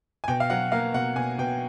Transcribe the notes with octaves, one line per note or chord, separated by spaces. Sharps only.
G#5
B2 G5
F5
F#3 F#5
A#3 F5
B2 F#5
B2 G#5
B2 G5